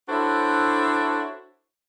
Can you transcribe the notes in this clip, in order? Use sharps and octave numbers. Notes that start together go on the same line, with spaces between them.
D4 E4 F#4 A4 C5 C#5